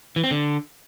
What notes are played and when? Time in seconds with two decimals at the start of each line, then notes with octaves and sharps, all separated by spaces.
0.16 E3
0.24 C4
0.31 D3